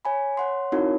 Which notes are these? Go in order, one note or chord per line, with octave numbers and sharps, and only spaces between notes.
C#5 G#5 B5
C#5 F#5 C6
C4 D#4 E4 F#4 A#4 C#5